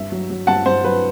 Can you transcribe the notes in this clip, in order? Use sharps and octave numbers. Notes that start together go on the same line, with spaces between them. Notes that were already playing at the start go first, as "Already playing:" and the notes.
Already playing: G2 E5
F#3
F#3
G2 F#5 A5
G2 C5
F#3 B4